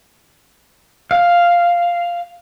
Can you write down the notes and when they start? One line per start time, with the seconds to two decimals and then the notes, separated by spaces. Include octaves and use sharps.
1.11 F5